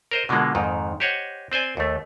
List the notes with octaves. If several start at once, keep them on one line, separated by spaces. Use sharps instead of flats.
A#4 C5 D#5
B2 D3 F3 G#3 A#3
F2 G#2 D#3
G4 C5 C#5 D#5 F#5
C4 C5 D5 G#5
D#2 A3